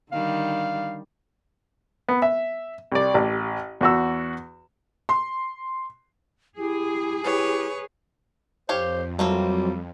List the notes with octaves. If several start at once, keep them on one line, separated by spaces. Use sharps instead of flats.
D3 D#3 G3 F5
B3
E5
C2 D5
A1
E2 F#4 E6
C6
E4 G4 G#4
E4 G4 B4 C#5
F2 G4 C5 C#5 F5
F#3 G3 A3 A#3 C4